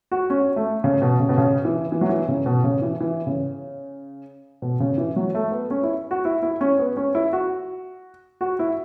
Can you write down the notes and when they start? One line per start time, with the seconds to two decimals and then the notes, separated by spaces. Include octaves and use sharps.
0.12 F#4
0.30 C#4
0.56 A3
0.84 C#3
1.02 B2
1.20 C#3
1.29 B2
1.38 C#3
1.65 E3
1.92 E3
2.01 F#3
2.09 E3
2.28 C#3
2.46 B2
2.64 C#3
2.82 E3
3.01 E3
3.27 C#3
4.62 B2
4.80 C#3
4.98 E3
5.16 F#3
5.35 A3
5.52 B3
5.71 C#4
5.83 E4
6.11 F#4
6.25 E4
6.43 E4
6.61 C#4
6.79 B3
6.97 C#4
7.15 E4
7.33 F#4
8.41 F#4
8.59 E4